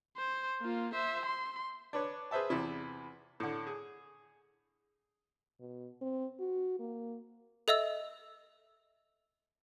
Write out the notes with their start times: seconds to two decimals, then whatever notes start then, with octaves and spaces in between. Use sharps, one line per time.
0.18 C5
0.62 A#3 F4
0.95 C5 E5
1.26 C6
1.93 D4 B4 C#5
2.31 G#4 B4 C5 E5 A5
2.50 E2 C3 E4
3.40 A2 D3
3.67 G#4
5.60 B2
6.01 C4
6.39 F#4
6.79 A#3
7.68 A4 D#5 E5 E6